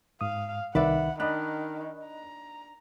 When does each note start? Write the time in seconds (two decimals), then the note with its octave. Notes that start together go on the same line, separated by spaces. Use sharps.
0.21 G#2 F5 D#6
0.75 C2 D#3 B4 D5 E5 F#5
1.20 D#3 D4 D#5 B5 F#6
2.05 A#5